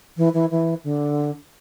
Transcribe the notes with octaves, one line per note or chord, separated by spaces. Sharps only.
E3
E3
E3
D3